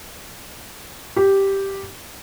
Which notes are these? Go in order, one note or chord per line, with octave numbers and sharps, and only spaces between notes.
G4